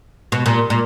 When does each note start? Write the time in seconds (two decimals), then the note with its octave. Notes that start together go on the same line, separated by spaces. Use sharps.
0.32 B2
0.46 A#2
0.70 A#2